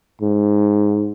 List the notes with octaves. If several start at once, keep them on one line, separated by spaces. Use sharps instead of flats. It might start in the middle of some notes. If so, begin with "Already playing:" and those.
G#2